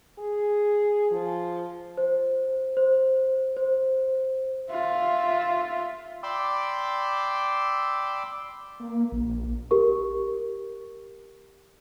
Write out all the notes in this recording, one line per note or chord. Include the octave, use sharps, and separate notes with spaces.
G#4
F3
C5
C5
C5
F4 E5
D5 G5 B5 C6 D6 E6
A#3
A#1
G4 A#4 C#6